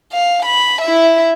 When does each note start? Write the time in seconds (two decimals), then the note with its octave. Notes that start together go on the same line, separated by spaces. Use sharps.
0.12 F5
0.45 B5
0.82 E4 E5